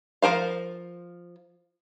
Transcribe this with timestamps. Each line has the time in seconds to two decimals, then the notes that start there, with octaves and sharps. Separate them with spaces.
0.22 F3 A#4 C5 F5